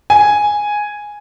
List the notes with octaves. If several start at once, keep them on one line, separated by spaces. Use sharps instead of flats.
G#5